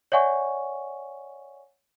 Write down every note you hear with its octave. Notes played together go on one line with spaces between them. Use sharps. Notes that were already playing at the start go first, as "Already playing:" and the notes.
C#5 D5 E5 F#5 G#5 C#6